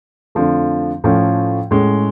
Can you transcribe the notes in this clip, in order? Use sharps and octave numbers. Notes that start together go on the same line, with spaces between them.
F2 D3 F3 A3
A2 F3 A3 C#4
A2 G#3 C#4